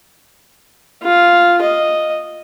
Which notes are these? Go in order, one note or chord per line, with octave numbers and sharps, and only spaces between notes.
F4
D#5